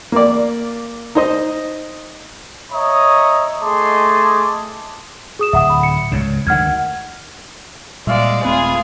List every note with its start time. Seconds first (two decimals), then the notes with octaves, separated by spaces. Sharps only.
0.12 A#3 D5
1.15 D#4 C5 D#5
2.72 C#5 D#5 E5 A#5 D#6
3.61 A3 G#4 D#5 A5 C6 D6
5.39 G#4 D#6 E7
5.53 D1 E5 F#5 D#6
5.70 B5
5.83 C#7
6.12 C#2 G#2 C#3
6.47 D2 D#3 F#5 F6 G#6
8.07 A#2 G3 G#3 D5 E5 F5 E6
8.44 D#1 A3 C4 F4 G#4 B4 G#5